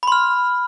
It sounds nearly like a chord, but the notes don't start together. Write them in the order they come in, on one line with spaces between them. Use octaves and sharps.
B5 C6 F6